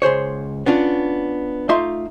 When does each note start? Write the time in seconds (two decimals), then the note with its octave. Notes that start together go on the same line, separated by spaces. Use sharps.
0.02 C#2 G#4 C5 C#5
0.66 B3 C#4 D4 F4
1.69 A3 D#4 F4 E5 C6